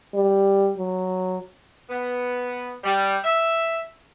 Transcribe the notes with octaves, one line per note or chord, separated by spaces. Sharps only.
G3
F#3
B3
G3
E5